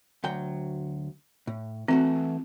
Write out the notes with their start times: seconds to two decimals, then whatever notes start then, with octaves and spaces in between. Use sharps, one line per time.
0.24 D2 F#3 G5
1.47 A2
1.88 E3 A3 C4 F#4